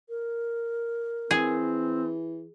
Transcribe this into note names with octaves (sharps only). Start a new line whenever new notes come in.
A#4
E3 C4 G#4